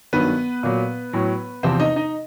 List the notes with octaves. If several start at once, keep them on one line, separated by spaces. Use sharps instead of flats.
G2 D#3 F#3 B3 B4
A#2 F#3
A2 F#3
E2 C3 F3 C4 C5
D#4 D#5
D#4 D#5